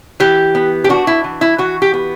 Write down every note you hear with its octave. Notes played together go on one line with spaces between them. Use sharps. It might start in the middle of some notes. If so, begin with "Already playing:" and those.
E3 G4
B3
G4
D4 F#4
E4
E3
E4
E3 F#4
G4
B3